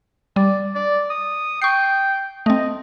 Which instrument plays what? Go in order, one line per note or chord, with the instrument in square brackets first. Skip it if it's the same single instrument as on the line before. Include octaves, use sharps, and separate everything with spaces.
[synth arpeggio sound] G3 [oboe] D5
[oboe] D5
D#6
[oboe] G5 [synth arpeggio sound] C#6 C7
[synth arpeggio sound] A3 C4 [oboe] D#5